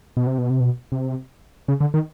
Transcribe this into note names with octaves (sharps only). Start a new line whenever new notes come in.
B2
C3
B2
C3
B2
C3
C#3
D3
D#3